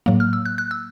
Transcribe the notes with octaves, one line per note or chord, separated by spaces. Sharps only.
A2 F#3 A#3
F6
E6
F#6
F#6
E6